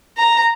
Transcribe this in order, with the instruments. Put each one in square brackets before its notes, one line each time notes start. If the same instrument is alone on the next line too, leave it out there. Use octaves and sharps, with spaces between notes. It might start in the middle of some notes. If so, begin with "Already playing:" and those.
[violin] A#5